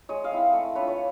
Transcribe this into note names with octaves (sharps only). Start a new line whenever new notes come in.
G#3 C#5 D#5
D#5 F5
C4 E4
A3
D4 F4 B4 C#5
C#5